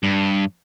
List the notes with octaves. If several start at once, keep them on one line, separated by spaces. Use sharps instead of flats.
G2